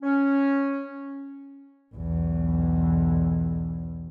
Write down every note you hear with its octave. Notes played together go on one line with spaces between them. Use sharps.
C#4
B1 E2